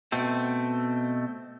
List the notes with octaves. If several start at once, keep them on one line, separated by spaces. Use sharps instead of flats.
B2 A3 C4